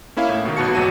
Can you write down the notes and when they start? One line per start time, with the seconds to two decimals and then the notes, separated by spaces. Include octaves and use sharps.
0.17 A#3 C#4 E4 E5 F5
0.29 A2
0.45 B2 D#3
0.57 G1 B2 B3 F#4 A5 C#7
0.75 G#1 E2 F#3 F#4 D#7